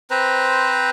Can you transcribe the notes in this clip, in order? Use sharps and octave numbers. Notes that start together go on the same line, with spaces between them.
C4 B4 C5 A#5